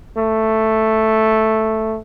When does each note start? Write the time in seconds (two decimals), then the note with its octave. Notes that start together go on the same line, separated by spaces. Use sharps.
0.17 A3